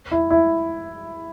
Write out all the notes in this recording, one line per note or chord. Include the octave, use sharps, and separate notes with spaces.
E4
E4